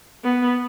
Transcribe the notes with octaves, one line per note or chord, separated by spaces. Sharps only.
B3